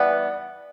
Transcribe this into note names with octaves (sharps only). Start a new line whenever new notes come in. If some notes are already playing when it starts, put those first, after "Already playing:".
Already playing: E3 G3 B3 D5 F#5